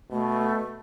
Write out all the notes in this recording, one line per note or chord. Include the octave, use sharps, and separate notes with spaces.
B2 A3